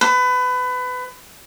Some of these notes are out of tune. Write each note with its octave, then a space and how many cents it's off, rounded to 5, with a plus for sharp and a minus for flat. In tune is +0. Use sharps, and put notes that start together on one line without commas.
B4 +25